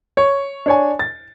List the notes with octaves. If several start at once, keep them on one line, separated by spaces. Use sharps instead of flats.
C#5
D4 C#5 G#5
A6